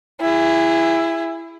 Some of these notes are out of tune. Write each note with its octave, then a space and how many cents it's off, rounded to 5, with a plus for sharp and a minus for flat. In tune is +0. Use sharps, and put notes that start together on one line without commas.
E4 +15 G#4 -25